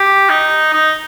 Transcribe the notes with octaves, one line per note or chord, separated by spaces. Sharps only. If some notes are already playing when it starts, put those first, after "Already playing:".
Already playing: G4
D#4
D#4